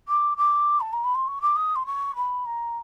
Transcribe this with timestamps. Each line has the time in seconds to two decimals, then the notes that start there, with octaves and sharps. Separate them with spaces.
0.08 D6
0.37 D6
0.81 A5
0.93 A#5
1.04 B5
1.15 C6
1.28 C#6
1.42 D6
1.56 D#6
1.76 C6
1.87 C#6
2.16 B5
2.46 A#5